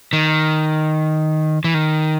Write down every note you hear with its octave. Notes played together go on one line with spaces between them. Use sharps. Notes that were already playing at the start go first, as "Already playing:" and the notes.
D#3
E3
D#3